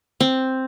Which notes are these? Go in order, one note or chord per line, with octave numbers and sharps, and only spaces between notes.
C4